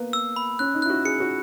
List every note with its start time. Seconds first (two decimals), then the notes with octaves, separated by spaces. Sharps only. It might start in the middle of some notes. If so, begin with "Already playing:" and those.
Already playing: A#3 B3
0.13 E6
0.36 B5
0.59 C#4 F#6
0.74 D#4
0.82 E4 F#6
0.90 F#4
1.05 G#4 C#7
1.20 F#4